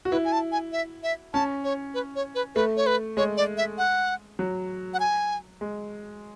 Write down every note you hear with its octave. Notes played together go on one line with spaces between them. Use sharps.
F#4
E4 B4
G#5
A5
G#5
E5
E5
C#4 A5
C#5
B4
C#5
B4
A3 B4
C#5
B4
G#3 C#5
D5
E5
F#5
F#3
F#5
G#5
G#3